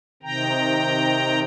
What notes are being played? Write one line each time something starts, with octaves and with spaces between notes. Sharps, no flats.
C3 D#3 G5 A#5